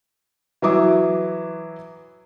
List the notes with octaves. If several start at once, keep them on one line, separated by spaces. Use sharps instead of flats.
E3 F#3 E5 D6 D#6